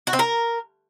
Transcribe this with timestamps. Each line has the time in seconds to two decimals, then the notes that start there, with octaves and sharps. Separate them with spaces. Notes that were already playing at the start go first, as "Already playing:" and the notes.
0.07 F#4
0.13 C4
0.19 A#4